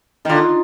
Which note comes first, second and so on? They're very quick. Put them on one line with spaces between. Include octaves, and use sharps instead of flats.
D#3 D#4 D3 F4